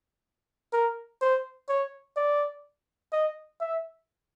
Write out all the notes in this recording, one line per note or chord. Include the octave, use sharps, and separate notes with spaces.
A#4
C5
C#5
D5
D#5
E5